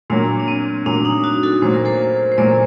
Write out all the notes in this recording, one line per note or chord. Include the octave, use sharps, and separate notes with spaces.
A#2 F#3 A#3 D4
D4
C4
A#2 F#3 A#3 D4
D#4
D4 F#4
F#4 A4
A#2 F#3 A#3 C5
A#4
A4 C5
C5
A#2 F#3 A#3 A#4 D5